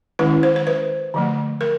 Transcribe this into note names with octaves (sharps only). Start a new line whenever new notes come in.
D#3 G#3 C#4 E4 B4
C5
C5
B4
D3 F3 A3
A#4